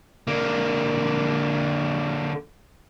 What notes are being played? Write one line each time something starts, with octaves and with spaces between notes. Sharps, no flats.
D3 A#3